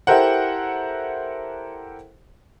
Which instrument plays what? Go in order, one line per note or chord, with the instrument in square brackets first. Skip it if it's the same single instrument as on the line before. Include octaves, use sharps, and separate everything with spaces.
[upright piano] E4 G4 A4 A#4 C5 F#5